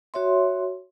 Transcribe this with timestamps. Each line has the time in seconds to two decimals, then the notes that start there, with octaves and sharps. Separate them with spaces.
0.14 F#4 C#5 E5 C6